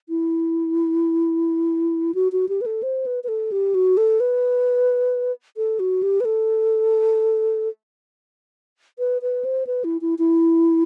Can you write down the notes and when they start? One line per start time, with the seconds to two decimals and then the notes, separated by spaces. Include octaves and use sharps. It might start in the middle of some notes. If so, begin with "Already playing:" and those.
0.09 E4
2.15 F#4
2.32 F#4
2.49 G4
2.61 B4
2.66 A4
2.83 C5
3.06 B4
3.24 B4
3.28 A4
3.52 G4
3.74 F#4
3.97 A4
4.20 B4
5.57 A4
5.79 F#4
6.03 G4
6.20 B4
6.25 A4
8.99 B4
9.22 B4
9.44 C5
9.67 B4
9.84 E4
10.01 E4
10.18 E4